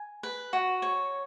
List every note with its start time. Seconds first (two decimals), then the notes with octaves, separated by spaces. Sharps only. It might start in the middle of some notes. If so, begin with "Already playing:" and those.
Already playing: G#5
0.23 B4
0.53 F#4
0.82 C#5